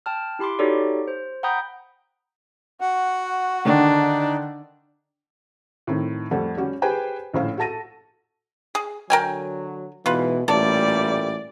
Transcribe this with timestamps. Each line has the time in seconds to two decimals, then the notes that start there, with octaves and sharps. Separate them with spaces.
0.06 G5 A5 F6
0.39 E4 G4 B5 C6 D6
0.59 D#4 F#4 G4 A4 C#5 D5
1.08 C5
1.43 F#5 G5 A#5 B5 D#6 G6
2.81 F#4 F#5
3.65 D3 D#3 D4 D#4
5.87 A2 D#3 C4
6.31 F2 G3 A3 F#5
6.57 G3 C#4 F#4 G4
6.82 G4 G#4 B4 C5 G5 G#5
7.34 A#1 A2 C#4 C5 F5
7.58 F#4 A4 A5 A#6 D#7
8.75 G#4
9.10 D3 F#3 A#4 G5 G#5
10.06 G#2 B2 E3 F4 B4
10.48 A1 A#2 G3 A3 A4 D5